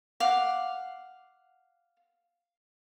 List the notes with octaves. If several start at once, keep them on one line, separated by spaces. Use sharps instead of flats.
F5 F#5 D6